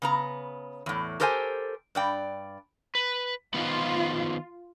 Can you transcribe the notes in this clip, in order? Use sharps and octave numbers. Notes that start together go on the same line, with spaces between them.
C#3 B3 A#5
E2 A2
G4 A4 A#4 C5 E5 G#5
G2 D5 G5
B4
D#3 F3 B3 F4